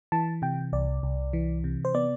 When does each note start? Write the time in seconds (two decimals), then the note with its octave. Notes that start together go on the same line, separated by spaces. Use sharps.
0.12 E3 A5
0.42 C3 G5
0.73 C2 D5
1.03 C2
1.33 E3
1.64 C3
1.85 C5
1.94 B3 D5